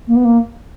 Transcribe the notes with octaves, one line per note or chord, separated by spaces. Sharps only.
A#3
B3
A#3